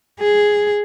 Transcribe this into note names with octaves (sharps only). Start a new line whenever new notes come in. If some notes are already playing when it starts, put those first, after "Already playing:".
G#4